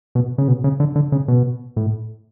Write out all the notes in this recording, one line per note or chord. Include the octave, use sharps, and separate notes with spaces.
B2
C#3
B2
C#3
D3
D3
C#3
B2
A2